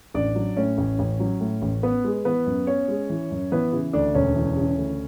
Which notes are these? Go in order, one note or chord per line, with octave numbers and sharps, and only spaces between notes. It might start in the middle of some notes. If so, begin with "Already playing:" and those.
A1 D4 D5
F#3
A2 C#4 C#5
A1
A1
F#3
A2
A1
B3 B4
G#3
E3 B3 B4
F#2
B3 C#4 C#5
G#3
E3
F#2
E3 B3 B4
C#3 E4
D2 D4 D5
E1 C#4 C#5
E3
C#3
D2